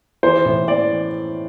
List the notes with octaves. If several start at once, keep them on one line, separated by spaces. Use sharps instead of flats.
E3 C5
A2
E3 D5